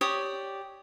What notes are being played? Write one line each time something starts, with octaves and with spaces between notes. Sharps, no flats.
G4 C#5 D5 D#6